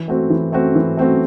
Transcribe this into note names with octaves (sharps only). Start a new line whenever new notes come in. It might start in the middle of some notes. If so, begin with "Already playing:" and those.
Already playing: E3
A3 C4 F#4
E3
A3 C4 F#4
E3
A3 C4 F#4